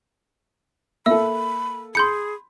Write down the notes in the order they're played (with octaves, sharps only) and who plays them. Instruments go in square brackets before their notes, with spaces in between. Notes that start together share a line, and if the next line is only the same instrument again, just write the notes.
[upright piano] A#3 A4 [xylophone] E5 E6 [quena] B5
[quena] G#4 [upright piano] B5 [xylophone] C6 G6 C#7